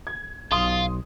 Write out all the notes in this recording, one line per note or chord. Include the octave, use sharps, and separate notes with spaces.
G#6
B1 F4 C6 D#6